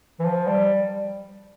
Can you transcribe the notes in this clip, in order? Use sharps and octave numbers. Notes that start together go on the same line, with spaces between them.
E3
F3
G3